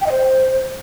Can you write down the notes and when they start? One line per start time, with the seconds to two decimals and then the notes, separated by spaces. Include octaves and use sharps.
0.01 G5
0.06 D#5
0.11 C5